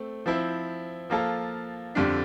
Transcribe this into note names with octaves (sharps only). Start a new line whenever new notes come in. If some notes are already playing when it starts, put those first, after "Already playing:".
Already playing: A3 C4
F3 C4 E4
F3 A#3 F4 A4
F2 D3 G3 D4